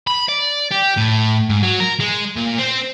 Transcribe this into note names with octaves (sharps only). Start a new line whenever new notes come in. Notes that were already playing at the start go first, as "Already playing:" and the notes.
B5
D5
G4
A2
G#2
F#3
A#4
G#3
A#2
C4